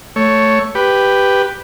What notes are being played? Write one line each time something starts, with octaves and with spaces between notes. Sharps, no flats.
A3 C#5
G4 B4